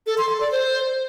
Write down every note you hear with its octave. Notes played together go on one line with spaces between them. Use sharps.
A4
C6
A4
D5
C5